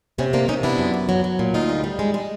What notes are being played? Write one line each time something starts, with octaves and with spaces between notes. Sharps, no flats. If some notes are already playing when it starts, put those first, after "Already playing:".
C3 B3 C#4
A#3 C4 D4
C3 C#4 D#4
B3 D4 E4
F#2
B3
F#3
F#3
A#2
D2 D#4 F4
G3
G3
G#3
G#3